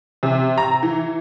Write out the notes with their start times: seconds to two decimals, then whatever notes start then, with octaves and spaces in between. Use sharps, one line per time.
0.23 C3
0.58 A#5
0.83 E3